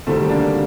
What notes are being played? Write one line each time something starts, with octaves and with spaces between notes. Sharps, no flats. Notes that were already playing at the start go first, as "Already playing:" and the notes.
D2 C3 D#3 G3 A3 C4
A#3 D4